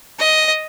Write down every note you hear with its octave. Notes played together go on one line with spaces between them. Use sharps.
D#5